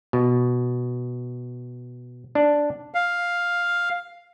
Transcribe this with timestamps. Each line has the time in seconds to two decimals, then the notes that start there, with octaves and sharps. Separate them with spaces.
0.13 B2
2.35 D4
2.94 F5